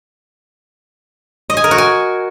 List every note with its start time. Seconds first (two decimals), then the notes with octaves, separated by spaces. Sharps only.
1.50 D#5
1.57 G#5
1.64 A#4
1.71 F#4
1.78 G#5